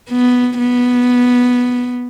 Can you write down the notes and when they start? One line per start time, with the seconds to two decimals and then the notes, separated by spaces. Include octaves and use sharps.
0.11 B3
0.58 B3